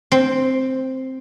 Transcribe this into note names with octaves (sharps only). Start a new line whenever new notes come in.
C4